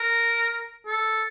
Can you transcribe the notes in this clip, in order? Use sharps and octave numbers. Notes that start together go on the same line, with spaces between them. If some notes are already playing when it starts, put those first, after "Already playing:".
Already playing: A#4
A4